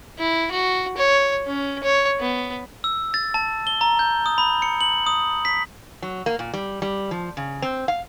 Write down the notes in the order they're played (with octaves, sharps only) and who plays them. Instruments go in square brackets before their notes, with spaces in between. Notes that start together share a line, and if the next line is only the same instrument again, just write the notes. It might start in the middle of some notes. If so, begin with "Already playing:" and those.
[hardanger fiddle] E4
F#4
C#5
C#4
C#5
B3
[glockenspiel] E6
A6
A5
G7
A#5
G6
D#6
B5
C#7
F#7
D#6
B6
[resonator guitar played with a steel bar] F#3
A#3
A#2
G3
G3
F3
C#3
C4
F5